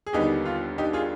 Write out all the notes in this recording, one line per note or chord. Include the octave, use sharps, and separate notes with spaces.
G#4
D#2 D3 G3 B3 D#4 G4
F4
D#4 G4
F4 G#4